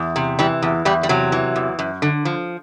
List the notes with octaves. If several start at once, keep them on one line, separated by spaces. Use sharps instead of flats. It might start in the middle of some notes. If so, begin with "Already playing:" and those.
Already playing: E2
C3
E3 G3
E2
E2 G3
G3
C3 F#3
E3
E2
F#2
D3
F3